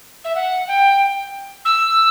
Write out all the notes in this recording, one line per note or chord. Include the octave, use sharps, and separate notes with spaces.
E5
F#5
G5
E6